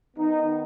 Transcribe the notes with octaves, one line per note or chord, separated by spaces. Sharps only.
D#3 B3 D#4